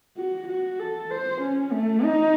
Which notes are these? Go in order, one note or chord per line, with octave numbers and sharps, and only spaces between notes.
F#4
F#4
A4
C5
C#4
A3
D#4